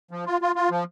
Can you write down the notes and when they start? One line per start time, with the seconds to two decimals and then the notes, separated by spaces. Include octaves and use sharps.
0.11 F3
0.26 F4
0.42 F4
0.56 F4
0.70 F3